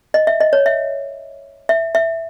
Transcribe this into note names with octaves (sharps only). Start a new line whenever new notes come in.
D#5
E5
D#5
C#5
E5
E5
E5